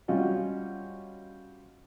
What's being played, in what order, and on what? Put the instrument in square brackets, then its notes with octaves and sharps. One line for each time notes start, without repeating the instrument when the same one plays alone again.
[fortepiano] G3 C#4 F4 F#4 D#5